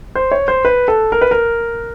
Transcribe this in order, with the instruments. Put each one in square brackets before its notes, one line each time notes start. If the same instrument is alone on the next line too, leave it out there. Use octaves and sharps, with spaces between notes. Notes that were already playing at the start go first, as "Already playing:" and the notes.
[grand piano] C5
C#5
C5
B4
A4
A#4
B4
A#4